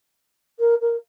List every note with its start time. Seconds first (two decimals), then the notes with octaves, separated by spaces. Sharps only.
0.59 A#4
0.80 A#4